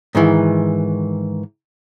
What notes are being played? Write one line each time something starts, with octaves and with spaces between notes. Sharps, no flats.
G#2 D#3 E3